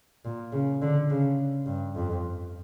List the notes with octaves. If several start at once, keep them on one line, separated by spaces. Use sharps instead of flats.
A#2
C#3
D3
C#3
G2
F2